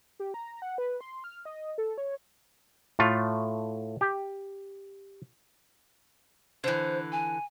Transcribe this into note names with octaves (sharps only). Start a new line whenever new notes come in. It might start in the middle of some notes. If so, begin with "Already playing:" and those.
G4
A#5
F#5
B4
C6
F6
D#5
A4
C#5
A2 A3 F4
G4
D3 E3 C5
G#5